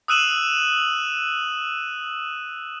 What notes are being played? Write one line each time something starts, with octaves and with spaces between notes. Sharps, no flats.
D#6 E6 F#6 D#7 E7 F#7